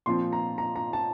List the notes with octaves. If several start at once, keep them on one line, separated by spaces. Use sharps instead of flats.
A#2 F3 C4 C6
A#5
A#5
A#5
A5